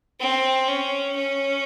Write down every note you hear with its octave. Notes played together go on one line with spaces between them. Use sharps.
C4
C#4
C#4